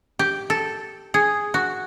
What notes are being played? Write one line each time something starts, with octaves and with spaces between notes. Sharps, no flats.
G4
A4
G#4
F#4